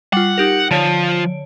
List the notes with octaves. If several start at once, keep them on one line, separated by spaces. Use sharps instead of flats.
G3 F4 F#5
D#4 G4 A#4
D3 F3 C#5 D7